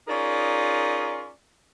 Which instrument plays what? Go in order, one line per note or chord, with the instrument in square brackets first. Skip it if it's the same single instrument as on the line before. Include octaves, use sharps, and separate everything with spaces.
[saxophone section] C#4 D#4 F4 G#4 A#4 D5